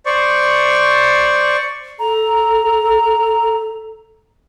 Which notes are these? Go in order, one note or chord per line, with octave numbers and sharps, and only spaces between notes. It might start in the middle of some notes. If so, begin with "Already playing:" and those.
C5 D5 C#6
A4 A#5